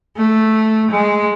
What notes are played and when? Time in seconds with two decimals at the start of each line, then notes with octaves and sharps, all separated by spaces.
0.16 A3
0.91 G#3